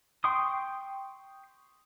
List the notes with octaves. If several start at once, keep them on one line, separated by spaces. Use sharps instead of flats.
G5 C6 C#6 D#6